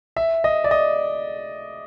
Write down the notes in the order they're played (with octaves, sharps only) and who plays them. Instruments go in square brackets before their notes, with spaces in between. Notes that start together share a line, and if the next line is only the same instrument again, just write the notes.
[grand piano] E5
D#5
D5
D#5